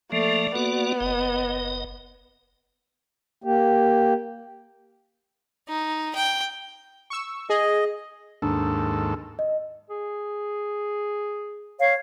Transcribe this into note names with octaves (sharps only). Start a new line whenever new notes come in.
F3 A3 A#3 D5
A#3 B3 F#4 D5
F#1 D#5
A#3 G4
D#4
G5
C#6 E6
G#4 D#5
D#2 G#2 D4 A4
D#5
G#4
C#5 F5